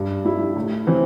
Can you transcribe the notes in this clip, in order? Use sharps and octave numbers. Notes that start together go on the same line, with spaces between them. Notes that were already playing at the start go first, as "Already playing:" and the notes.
Already playing: G2
G3 E4
A2
E3 C4